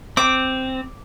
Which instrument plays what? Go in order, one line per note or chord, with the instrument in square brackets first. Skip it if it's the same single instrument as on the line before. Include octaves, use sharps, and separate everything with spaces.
[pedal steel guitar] C4 [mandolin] D6